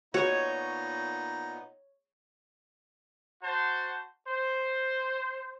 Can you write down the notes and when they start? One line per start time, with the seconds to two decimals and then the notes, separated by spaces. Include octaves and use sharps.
0.14 A#2 B3 D#4 F#4 C#5
3.42 F#4 C5 A5
4.27 C5